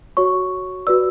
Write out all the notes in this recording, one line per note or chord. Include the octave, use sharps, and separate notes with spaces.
F#4 C#5 C#6
F#4 B4 D5 E6